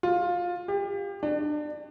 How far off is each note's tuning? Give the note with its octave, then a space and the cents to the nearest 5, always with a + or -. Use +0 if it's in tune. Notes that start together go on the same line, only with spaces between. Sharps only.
F4 +15
G4 +30
D4 +30